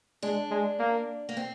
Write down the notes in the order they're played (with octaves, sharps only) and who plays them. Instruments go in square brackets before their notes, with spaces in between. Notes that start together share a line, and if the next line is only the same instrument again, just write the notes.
[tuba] G#3 [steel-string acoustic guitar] D4
[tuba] G#3
A#3
[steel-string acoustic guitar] A#3
C4